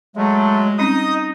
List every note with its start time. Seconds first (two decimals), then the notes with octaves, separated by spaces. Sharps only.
0.17 F#3 G#3 A3
0.78 G3 C4 C#4 D#4 D#5 D#6